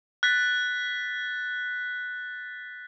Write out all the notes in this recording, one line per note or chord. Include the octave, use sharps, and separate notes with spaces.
F#6 A6 B6